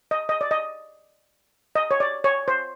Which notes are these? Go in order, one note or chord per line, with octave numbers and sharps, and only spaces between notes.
D#5
D#5
D5
D#5
D#5
C#5
D5
C#5
C5